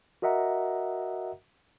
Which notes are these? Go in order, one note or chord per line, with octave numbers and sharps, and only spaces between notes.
F#4 A#4 D#5 E5 F#5 A#5